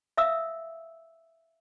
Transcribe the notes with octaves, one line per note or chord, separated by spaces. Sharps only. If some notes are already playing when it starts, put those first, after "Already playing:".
E5 F5 D#6 E6